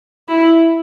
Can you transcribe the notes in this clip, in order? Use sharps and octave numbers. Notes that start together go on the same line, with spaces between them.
E4